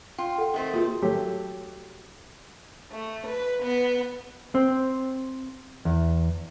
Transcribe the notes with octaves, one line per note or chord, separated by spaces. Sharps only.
F4 G5
A4 F#5
D#3 A3 C4
A#3 F4 F#4 G#4
F#3 A3 G4
A3
B4
B3
C4
E2